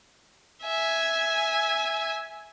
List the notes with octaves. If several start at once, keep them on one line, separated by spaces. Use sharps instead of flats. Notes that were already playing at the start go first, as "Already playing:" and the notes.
E5 G#5